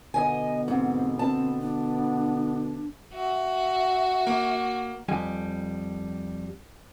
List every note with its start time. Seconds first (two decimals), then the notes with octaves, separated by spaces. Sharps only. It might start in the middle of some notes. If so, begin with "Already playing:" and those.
0.14 B2 D3 B3 D#5 G#5
0.68 G#2 C4
1.19 C4 A5
1.60 D4
3.13 F#4 E5
4.27 A#3
5.08 F2 G3 G#5